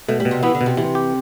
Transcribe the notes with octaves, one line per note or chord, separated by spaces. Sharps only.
B2 A3
G3
B2
C3
E3 B3
D3
B2
C3
C3 E3
G4